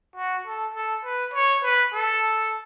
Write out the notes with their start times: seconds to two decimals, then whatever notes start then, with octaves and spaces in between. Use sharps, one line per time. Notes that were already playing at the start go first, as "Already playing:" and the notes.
0.16 F#4
0.45 A4
0.74 A4
1.05 B4
1.34 C#5
1.63 B4
1.93 A4